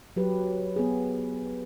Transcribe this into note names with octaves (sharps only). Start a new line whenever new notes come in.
F#3 G4 B4
B3 G#4